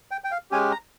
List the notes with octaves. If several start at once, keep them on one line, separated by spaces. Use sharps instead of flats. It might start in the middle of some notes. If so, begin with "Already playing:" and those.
G5
G5
F5
G#3 C#4 G4 G#5
A#5